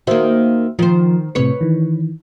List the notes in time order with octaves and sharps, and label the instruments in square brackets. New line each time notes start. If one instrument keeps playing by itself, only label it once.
[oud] D#3 A#3 [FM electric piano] F#4 C5 E5
[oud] D#3 C5 [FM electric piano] F3
[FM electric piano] A2 C3 C#7 [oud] B4 C#5
[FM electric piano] D#3 E3